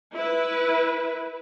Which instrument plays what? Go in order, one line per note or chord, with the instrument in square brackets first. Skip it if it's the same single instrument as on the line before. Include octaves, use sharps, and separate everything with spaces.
[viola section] E4 B4